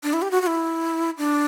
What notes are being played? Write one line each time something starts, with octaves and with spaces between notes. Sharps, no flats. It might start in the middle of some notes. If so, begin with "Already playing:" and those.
D4
E4
G4
F#4
F#4
E4
D4